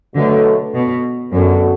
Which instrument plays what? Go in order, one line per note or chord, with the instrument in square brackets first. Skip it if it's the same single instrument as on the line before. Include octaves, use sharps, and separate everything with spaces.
[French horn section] B2 F#3 A3 [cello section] D3
[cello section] B2
[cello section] F#2 [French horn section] D3 B3 F#4 A4